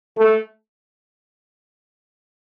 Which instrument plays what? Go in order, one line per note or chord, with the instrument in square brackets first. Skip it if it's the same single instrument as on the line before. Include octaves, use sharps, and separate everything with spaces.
[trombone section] A3